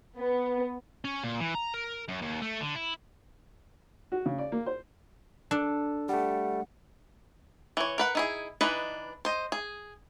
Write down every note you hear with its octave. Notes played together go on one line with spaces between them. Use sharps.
B3
C#4
A#2
E3
A#5
A#4
F#2
D#2
A3
D3
E4
F#4
C#3
D5
A#3
C5
D4 A4
G3 A3 F#5
E3 C#5
A#4 B4 F#5
D#4 E4 G#4
E3 D4 D#4 B4 D#5
C5 D#5
G#4